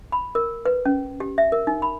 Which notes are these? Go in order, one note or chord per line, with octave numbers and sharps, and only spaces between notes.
B5
A#4
B4
C#4
G4
E5
A#4
D#4
B5